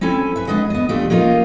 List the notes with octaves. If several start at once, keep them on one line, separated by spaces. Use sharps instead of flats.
C4 C#4 E4 A4 G#5
B4 E5
G#3 D4 B4 D#5 F#5
B3 D#5
E2 A#2 A3 D4 G4
A#3 C#4 D#4 F4 A#4 D#5